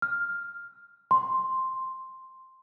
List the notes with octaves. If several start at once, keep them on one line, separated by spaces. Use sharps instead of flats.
F6
C6